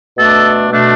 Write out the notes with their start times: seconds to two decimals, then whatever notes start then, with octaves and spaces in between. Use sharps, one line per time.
0.18 B2 A3 D4 A4
0.69 B2 A3 D4